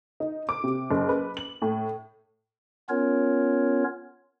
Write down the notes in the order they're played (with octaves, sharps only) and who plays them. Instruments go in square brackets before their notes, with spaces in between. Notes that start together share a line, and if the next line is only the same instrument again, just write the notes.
[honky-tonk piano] D#4
D6
C3
F#1
B4
F#7
A2
[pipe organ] B3 C#4 F4 A#4 C#5